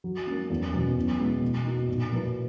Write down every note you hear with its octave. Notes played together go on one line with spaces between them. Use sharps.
F#3
A#3 C#4
E2
B2 F#3 C#4
B2
G#3 B3 E4
B2
A#3 D#4 F#4
A#2
F#3 A#3 E4 B4